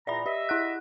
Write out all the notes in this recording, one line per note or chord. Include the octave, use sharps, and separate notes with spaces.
E2 A#2 D5 E5 A#5 B5
G4 D#5 E5
E4 F#5 F#6